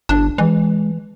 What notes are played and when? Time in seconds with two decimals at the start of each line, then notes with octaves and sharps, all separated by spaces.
0.09 G1 D4
0.38 E3 G#3